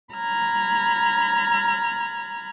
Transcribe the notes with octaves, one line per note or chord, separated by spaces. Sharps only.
A#5 B5 F6 G#6